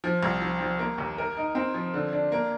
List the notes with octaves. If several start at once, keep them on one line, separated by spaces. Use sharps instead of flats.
F3
C2
F3
F3
A#3
D#2
A#4
D#4
C4
F3
D3
D4
A#3